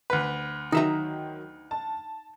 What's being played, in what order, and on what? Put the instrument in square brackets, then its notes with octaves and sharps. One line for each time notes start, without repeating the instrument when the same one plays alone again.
[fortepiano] D2 B4
[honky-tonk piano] D#3 F#3 [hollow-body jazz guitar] D#4 E5 A#5
[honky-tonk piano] A5